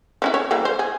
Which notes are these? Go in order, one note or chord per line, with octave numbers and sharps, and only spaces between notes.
F3 C#4 E4
C#5
E3 G3 A#3
C5
G#4